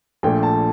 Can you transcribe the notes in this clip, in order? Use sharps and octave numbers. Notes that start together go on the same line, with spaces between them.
A#1 A#2 A3 G5
A5